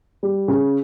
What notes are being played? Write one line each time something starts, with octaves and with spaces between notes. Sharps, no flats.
G3
C#3